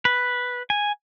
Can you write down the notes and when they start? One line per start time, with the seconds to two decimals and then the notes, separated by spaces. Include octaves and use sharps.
0.05 B4
0.70 G#5